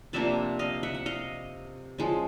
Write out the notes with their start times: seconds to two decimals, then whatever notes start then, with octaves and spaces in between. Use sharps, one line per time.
0.13 C3 F3 A#3 D4 D5 E5
0.59 D#5 F5
0.83 E5 F#5
0.95 F#5
1.06 D#5 F5
1.98 F3 G#3 C#4